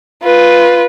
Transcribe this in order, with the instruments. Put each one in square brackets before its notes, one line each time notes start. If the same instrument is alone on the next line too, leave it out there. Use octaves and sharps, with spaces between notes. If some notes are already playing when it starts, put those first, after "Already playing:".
[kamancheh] F4 B4